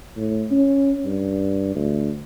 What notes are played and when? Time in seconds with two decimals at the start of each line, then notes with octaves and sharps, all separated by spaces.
0.17 A2
0.50 C#4
1.05 G2
1.75 D2